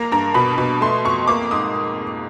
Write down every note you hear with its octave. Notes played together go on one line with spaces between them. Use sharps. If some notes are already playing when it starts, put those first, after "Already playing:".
Already playing: A#3 A#5
G2 A#5
B2 B5
B2
A3 C6
F2 C#6
A#3 D6
G#2 D#6